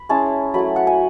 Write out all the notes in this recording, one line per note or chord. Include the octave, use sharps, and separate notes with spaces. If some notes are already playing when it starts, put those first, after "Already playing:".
Already playing: B5
G#3 C#4 E4 A5
F#3 A3 E4 B5
F#5
G#5